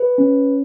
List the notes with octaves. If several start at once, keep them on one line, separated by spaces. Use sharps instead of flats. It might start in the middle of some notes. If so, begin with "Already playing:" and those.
Already playing: B4
C#4